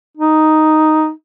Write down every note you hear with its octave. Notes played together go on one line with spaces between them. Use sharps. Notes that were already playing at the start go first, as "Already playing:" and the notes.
D#4